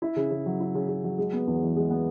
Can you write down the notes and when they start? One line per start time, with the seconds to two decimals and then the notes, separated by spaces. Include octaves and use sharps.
0.02 E4
0.16 C#3
0.31 C#3
0.46 F#3
0.60 E4
0.75 C#3
0.88 C#3
1.04 F#3
1.18 G#3
1.33 B3
1.47 E2
1.62 E3
1.76 G#3
1.90 B3